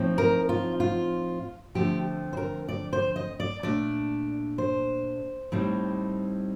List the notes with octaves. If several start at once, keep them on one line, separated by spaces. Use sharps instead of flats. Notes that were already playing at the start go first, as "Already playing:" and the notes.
Already playing: A2 F3 C4 D#4
A#4
F4
F4
D3 F3 A3 C4 G4
C5
A#4
D5
C5
D#5
D5
A#2 A3 D4 D5
C5
A2 G3 C4 D#4